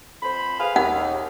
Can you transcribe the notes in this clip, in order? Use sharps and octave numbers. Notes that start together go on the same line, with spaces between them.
F2 C5 B5
G#4 B4 F5
D#2 F#5